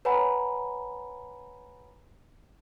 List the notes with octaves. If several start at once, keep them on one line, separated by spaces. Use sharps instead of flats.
B4 C#5 F#5 G#5 A#5 B5